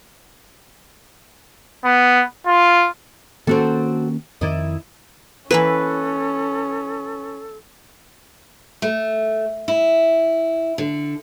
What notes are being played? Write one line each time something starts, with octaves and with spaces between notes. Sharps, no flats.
B3
F4
D#3 A#3 C4 C#4 F#4 A4
F2 D#3 E4 D5 D#5
E3 A#3 C#4 E4 A4 B4
A3
E4
D3